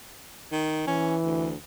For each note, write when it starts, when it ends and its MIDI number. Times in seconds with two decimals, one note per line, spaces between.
0.52 0.84 51
0.87 1.51 52
0.87 1.16 61
1.24 1.56 38